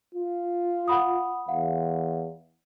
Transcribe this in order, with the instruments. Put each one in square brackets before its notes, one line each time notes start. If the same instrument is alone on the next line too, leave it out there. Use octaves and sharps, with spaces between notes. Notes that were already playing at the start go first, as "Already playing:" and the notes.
[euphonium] F4
[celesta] F#5 B5 D#6
[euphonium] E2 [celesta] F5 F#5